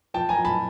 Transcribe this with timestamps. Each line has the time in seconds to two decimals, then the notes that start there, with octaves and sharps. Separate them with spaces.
0.14 F3 G5 A5
0.29 G#5 A#5
0.37 F3
0.45 A5 B5